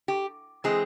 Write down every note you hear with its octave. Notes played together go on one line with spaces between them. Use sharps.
G4
E3 G#3 C4 G#4